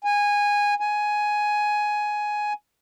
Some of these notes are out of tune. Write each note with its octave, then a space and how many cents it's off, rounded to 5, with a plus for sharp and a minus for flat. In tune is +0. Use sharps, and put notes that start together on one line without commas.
G#5 -15
G#5 +10